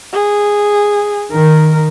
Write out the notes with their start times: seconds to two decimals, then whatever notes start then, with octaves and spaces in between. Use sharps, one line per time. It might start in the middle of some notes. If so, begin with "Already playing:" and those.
0.13 G#4
1.32 D#3 A#4